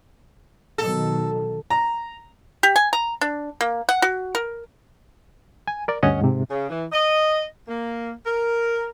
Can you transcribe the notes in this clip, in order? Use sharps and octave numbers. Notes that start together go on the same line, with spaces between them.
B2 D#3 F#3 A4
A#5
G4
G#5
A#5
D4
A#3
F#5
F#4
A#4
G#5
A#4 D5
D2 G2 C#4 C#5 D#5 F#5
G#2 C3
C#3
E3
D#5
A#3
A#4